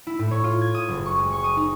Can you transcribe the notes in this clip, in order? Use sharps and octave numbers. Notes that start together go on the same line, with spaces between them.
E4
A2
C#5
F4
G#6
D#6
F#1
C#6
G#3
C#6
D#6
D#4